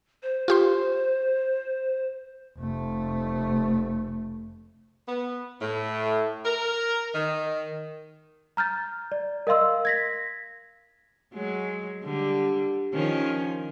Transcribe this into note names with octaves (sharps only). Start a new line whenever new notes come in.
C5
F4 G4 C6
F1 A3
B3
A2
A#4
D#3
A#5 F6 G6 A6
D5
A#4 D#5 F5 C6 E6
G#6 A#6 B6
F#3 G#3
D3 G3
D#3 F3 C#4